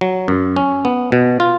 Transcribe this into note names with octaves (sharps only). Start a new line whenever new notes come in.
F#3
F#2
C#4
B3
B2
F4